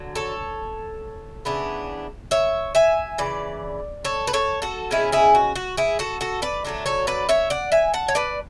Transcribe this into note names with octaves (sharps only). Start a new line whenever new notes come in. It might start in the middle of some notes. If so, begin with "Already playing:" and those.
Already playing: D3 F#3
A4 C#5
C#3 E3 B3 D4
C#5 E5
E5 G#5
C#3 E3 D5
A4 C#5
B4
A4 C#5
F#4 A4
B2 G#3 C#4 E4 G#4
E4 G#4
F#4
F#4
E4 G#4
F#4 A4
F#4 A4
B4 D5
D3 F#3 A3 D4
A4 C#5
B4 D5
C#5 E5
D5 F#5
E5 G#5
F#5 A5
C#5
B4 D5